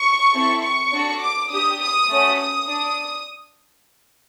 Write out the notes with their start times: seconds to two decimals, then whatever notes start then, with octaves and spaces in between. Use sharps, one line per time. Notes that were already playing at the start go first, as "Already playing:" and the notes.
Already playing: C#6
0.32 C4 E4 A4
0.62 C#6
0.92 D4 F#4 A4
1.21 D6
1.51 D4 G4 D#6
1.81 D#6
2.09 A3 C#4 F#4
2.39 D#6
2.68 D4